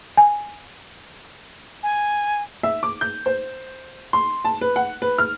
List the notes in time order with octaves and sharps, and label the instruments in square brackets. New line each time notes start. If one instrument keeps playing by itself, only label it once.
[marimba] G#5
[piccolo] G#5
[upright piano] E5
D6
G6
C5
C6
A5
B4
F#5
B4
F6